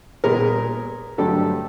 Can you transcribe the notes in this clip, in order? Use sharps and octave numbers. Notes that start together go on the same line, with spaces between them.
A#2 G3 B3 G#4 A#4
G2 D3 F#3 A3 D4 G4 A4